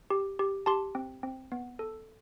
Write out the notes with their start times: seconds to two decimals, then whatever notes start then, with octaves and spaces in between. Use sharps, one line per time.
0.10 G4
0.39 G4
0.66 G4 A5 C6
0.95 C4
1.23 C4
1.52 B3
1.79 A4